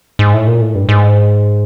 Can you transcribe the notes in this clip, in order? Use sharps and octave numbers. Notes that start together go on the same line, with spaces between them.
G#2
A2
A#2
A2
G2
G#2